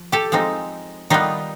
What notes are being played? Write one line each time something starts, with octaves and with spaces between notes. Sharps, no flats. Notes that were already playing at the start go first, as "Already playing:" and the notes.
Already playing: F3
G4 A4
F3 G#3 C4 D#4
D#3 G3 B3 D#4 F4